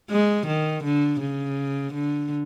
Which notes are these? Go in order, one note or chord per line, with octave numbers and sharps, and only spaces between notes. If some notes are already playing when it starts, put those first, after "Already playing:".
G#3
D#3
D3
C#3
D3